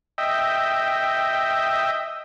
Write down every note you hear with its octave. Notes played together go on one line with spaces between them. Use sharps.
D#5 E5 G5